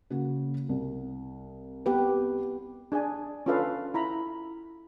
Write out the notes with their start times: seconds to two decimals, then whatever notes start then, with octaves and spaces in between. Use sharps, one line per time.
0.10 C#3 A#3 F#4
0.69 C2
1.86 B3 G4 B4
2.92 D4 G#4 D5 G#5
3.46 C#4 D4 F4 A4 B4 F5
3.94 E4 A#5 B5